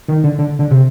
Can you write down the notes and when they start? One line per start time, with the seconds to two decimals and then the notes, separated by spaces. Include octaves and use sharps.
0.08 D#3
0.24 D3
0.39 D3
0.59 D3
0.71 C3